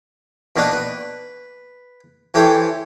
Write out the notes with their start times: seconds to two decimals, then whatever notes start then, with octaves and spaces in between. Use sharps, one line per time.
0.56 B2 D#3 A#3 D4 B4
0.72 B4
2.34 E3 G4 A4 C5 C#5 A5